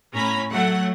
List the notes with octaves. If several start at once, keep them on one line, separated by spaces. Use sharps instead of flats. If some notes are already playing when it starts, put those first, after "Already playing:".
A2 C#4 A#5 B5
F#3 A3 F#5